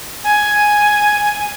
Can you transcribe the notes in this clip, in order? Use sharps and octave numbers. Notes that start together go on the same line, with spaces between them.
G#5